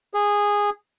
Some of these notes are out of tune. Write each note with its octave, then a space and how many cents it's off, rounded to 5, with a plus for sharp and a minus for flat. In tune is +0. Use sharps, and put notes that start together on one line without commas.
G#4 -15